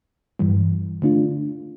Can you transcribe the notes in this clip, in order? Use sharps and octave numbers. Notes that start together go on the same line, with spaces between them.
G2 E3 G3
D3 A3 D4 F4